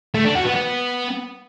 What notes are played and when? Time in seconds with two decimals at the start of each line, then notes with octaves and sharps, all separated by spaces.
0.14 A3
0.25 D4
0.35 F#4
0.46 B3
0.56 B3